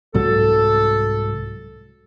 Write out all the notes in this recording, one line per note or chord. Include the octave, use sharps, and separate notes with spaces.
C2 G#2 F#3 A4